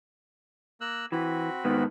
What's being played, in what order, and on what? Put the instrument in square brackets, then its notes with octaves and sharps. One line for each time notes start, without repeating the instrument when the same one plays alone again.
[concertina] A#3 E6 F#6
[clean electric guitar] E3 [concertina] C4 F#4 B5
[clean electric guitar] G#2 D#3 B3